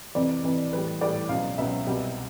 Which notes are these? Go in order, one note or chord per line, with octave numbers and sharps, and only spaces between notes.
F2 C3 E3 D5
F2 C3 E3
A2 E3 G3 B4
A2 E3 G3 D5
C#2 B2 F#3 F5
C#2 B2 F#3 E5
C2 B2 G3